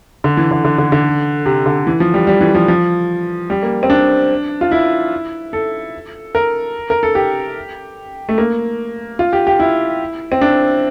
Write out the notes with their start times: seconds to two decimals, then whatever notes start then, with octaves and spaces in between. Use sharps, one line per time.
0.24 D3
0.37 E3
0.51 D3
0.65 D3
0.78 D3
0.92 D3
1.46 C3
1.66 D3
1.87 E3
2.00 F3
2.14 G3
2.27 G3
2.41 E3
2.55 F3
2.68 F3
3.50 G3
3.63 A#3
3.83 C4
3.90 D4
4.61 F4
4.71 E4
5.53 A4
6.35 A#4
6.90 A#4
7.03 A4
7.15 G4
8.29 A3
8.38 A#3
9.19 F4
9.33 G4
9.47 G4
9.60 E4
10.32 C4
10.41 D4